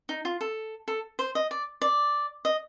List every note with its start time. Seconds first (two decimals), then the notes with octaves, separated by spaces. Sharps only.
0.09 D#4
0.25 F4
0.41 A4
0.88 A4
1.19 C5
1.35 D#5
1.51 D5
1.82 D5
2.45 D#5